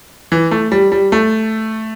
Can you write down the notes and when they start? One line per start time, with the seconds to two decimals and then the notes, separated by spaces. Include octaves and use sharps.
0.32 E3
0.51 A3
0.72 G3
0.92 G3
1.12 A3